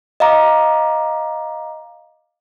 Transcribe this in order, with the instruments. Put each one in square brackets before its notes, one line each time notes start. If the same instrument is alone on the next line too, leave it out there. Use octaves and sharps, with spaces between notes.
[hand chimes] D#5 F5 A#5 D6